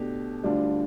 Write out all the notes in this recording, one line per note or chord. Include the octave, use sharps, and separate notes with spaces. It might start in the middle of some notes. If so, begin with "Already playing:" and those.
Already playing: B2 A3 D4 G4
D2 D3 G3 D4 F4